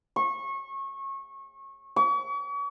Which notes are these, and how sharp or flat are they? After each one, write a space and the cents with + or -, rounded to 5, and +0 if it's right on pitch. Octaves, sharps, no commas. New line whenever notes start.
C#6 -25
C#6 +40